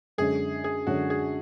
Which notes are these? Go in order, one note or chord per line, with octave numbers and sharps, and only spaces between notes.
F#2 D3 G#3 C#4 G#4
G#4
F#2 D3 G#3 C#4 F#4
G#4